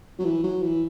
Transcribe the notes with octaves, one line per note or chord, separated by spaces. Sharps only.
F#3
E3
F#3
E3